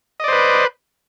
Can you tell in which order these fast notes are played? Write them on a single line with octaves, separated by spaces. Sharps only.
D#5 D5 C5 B4